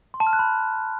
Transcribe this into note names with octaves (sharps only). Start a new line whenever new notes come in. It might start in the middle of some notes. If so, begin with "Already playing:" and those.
C6
A5
F6
F#6
B5